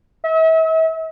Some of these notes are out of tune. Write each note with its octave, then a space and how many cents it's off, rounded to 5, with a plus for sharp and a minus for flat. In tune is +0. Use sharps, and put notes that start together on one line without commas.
E5 -40